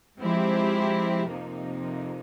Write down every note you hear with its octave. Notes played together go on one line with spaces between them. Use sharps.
F3 G#3 C4 E4 G4
F2 C3 F3 A#3 D#4